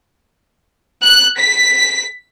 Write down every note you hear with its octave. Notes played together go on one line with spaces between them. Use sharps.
F#6
B6